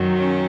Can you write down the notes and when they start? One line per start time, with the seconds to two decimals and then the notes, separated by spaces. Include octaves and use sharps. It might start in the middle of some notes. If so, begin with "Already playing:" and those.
Already playing: F#2 D#3 F#3
0.17 C#4